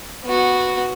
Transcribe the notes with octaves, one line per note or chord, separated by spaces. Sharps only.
B3 F#4